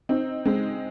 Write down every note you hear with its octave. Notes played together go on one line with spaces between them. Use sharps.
C4 D#4
G#3 C4